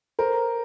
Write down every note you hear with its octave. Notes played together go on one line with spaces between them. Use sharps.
A#4 C5